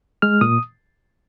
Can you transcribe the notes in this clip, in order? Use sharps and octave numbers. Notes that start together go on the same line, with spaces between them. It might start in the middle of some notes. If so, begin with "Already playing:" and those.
G#3 F6
A#2 D#6